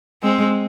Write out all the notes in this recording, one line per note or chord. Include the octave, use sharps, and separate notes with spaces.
G#3 C4